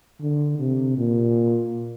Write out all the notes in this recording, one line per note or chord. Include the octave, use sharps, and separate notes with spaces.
D3
C3
A#2